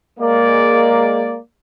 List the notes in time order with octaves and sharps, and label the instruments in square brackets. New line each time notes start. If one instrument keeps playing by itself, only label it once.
[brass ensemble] G#3 A#3 D5